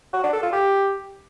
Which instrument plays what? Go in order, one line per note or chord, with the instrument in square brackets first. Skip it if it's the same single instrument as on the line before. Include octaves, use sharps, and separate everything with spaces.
[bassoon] F#4
D4
A4
F4
G4